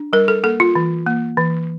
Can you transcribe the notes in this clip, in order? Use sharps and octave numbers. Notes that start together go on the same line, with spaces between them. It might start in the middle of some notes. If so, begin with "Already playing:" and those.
Already playing: D4
G3 A#4
A4
A#3 A4
F4
E3
A#3
E3